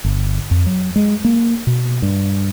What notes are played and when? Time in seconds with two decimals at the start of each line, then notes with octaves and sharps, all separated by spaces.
0.04 G1
0.51 F2
0.66 F#3
0.96 G#3
1.25 A#3
1.67 B2
2.02 G2